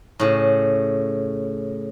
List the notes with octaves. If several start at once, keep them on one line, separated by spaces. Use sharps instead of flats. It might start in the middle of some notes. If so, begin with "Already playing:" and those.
A2 C#3